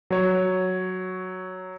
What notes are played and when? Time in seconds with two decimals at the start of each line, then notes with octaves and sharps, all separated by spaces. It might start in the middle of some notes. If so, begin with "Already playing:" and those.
0.11 F#3 C#5